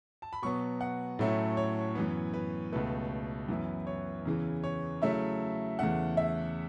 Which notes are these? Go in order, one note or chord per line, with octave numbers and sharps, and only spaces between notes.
A5
B5
B2 F#3 B3 C#6
F#5
A2 F#3 A3 C#4 E4
C#5
F#2 E3 B3
B4
C#2 B2 A3 B4
F#2 E3 B3 E4
C#5
E2 C#3 E3
C#5
C#3 F#3 A3 E4 E5
E2 C#3 A3 F#5
E5